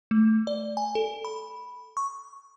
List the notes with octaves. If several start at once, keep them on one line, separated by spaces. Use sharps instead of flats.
A3
D5
G#5
A4
B5
C#6